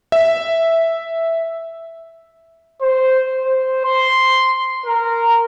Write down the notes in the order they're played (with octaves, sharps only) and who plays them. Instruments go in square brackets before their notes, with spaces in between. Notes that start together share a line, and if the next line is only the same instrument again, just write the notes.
[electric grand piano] E5
[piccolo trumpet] C5
C5
C6
A#4